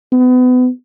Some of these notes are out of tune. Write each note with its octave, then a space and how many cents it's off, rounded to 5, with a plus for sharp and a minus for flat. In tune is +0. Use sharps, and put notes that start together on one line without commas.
B3 +30